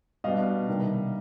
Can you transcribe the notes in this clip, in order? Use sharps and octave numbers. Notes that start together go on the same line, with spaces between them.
B2 G3 B3 D4 D#5 F5
C3 D#3 G3 A#3